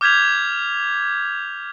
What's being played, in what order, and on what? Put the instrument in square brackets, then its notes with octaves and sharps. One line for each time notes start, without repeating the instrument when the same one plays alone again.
[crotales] D6 F6 G6 G#6 B6 F7